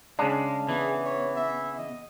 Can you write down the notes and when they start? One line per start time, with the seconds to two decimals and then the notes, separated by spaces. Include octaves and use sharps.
0.19 C#3 G#3 D4 F5
0.69 E3 B3 G#4
1.05 C#5
1.36 E5
1.78 D#5